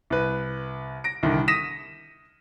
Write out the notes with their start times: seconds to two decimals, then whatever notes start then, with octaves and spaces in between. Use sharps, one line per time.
0.10 C2 B4
1.04 A#6 D7
1.23 C2 D3 D#3
1.48 D#6 A#6 B6 D#7 E7